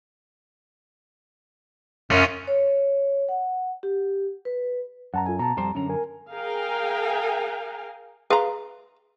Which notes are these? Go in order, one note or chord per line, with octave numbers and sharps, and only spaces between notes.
F#2 C#4 F4
C#5
F#5
G4
B4
F#2 F#5 A5 A#5
F4 A4 G#5
B2 A5 A#5
F2 G3 C5
F#2 D3 C#4 A#5
A#4 G#5
G#4 A#4 F5 G5 G#5 A#5
G#4 B4 F5 A#5 C6